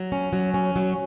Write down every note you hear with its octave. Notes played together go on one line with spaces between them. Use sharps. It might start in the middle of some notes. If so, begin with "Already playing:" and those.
Already playing: F#3
C#4
F#3
C#4
F#3